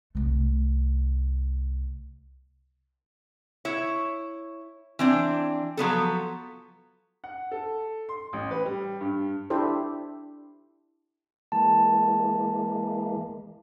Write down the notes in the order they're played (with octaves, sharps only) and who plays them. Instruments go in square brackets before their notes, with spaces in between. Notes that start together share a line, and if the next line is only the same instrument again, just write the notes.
[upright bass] C2 A3
[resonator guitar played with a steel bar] E4 C#5
E3 C4 D4
F3 F#3 B3 A4
[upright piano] F#5
A4
C6
A1
B4
G3
G2
[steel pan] D4 E4 G4 A4 C5
[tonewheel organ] E3 G#3 A#3 [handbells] A5